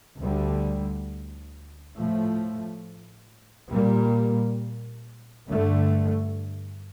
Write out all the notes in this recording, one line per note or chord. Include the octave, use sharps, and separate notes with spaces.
D2 D3 G3
A2 F3 A3
A#2 G3 A#3
G2 D3 A3